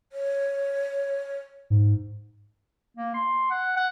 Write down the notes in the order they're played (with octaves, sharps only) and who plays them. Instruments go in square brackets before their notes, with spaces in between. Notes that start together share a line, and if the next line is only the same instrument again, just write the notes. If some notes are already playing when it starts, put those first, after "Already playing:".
[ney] C#5
[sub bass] G#2
[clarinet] A#3
C6
F#5
F#5